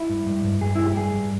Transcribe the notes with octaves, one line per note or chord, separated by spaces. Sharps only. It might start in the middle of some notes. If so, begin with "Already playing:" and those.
Already playing: E4
G2
G2
G2
G2 G#4
G3 E4
G4
G2 G#4
G2